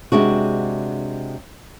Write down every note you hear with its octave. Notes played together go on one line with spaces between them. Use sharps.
C3 G#3 D4 F#4